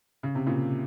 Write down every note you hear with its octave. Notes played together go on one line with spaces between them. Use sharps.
C#3
C3
A#2 C#3